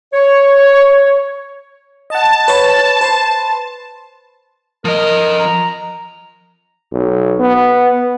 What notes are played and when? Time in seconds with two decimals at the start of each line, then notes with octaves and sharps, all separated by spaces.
0.14 C#5
2.10 D#5 F#5 A5
2.48 B4 C#5
3.01 B4 C5 C6
4.85 F3 A#4 D#5
5.39 A#5
6.92 B1
7.40 B3